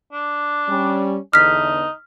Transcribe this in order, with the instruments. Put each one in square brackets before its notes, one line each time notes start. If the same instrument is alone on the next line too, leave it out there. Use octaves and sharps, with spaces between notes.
[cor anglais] D4
[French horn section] G3 C#4
[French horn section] E2 D3 [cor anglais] D#4 [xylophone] F6 B6